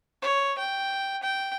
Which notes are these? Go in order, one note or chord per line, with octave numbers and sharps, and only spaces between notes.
C#5
G5
G5